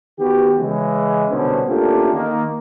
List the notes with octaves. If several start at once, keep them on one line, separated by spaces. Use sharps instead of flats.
D#3 B3 F#4 G4
C#3 E3 G#3
C2 B2 D3 B3 C#4 C5
A3 A#3 C#4 D4 F4 G4
D#3 A#3